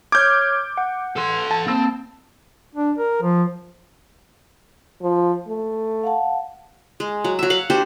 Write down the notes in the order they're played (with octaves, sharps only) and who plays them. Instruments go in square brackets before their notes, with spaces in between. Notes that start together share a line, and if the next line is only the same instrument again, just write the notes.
[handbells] C#5 F6 G#6 [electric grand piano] D6 G6
[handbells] F#5
[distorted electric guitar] A4 C6
[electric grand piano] A5
[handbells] A#3 E6 [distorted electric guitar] C4
[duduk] D4
A#4
F3
[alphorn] F3
A3
[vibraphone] F5 F#5 A5
[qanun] G#3
F#3
F#3 E5
F5 F#5
D4 F#4 G4 C5